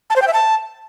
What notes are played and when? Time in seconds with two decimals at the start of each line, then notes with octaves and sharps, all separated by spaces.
0.10 A5
0.16 C5
0.22 G5
0.28 E5
0.33 A5